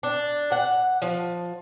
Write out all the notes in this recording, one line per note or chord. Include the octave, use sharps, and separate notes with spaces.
D4
F#5
F3